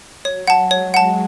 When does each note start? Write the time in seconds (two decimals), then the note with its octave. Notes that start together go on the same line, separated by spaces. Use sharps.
0.25 F#3 C#5
0.47 F#5 A5
0.71 G#3 C#5
0.94 F#5 A5